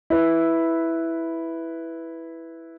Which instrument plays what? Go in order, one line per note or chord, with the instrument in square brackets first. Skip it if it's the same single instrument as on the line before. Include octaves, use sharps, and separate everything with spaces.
[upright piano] E4 B4